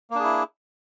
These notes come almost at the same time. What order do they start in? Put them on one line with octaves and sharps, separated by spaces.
A#3 D4 G#4 E4